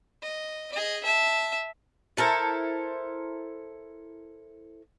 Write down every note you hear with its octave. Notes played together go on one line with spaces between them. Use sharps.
D#5
G#4 D#5
E5 A5
E4 A4 A#4 C5